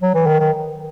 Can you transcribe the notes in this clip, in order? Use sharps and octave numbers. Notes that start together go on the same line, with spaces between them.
F#3
E3
D#3
D#3